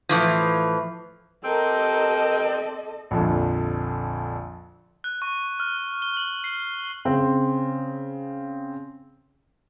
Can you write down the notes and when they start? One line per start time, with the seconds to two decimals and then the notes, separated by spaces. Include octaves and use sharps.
0.09 A2 E3 F3
1.44 C4 G4 A4 A#4 D#5 A#5
3.11 A#1 F2 D3
5.04 F#6
5.22 C#6
5.60 F6
6.02 G7
6.17 F#7
6.44 C7
7.05 C#3 C4